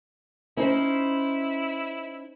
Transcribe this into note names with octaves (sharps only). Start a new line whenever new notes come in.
C#4 D#4 E4 C5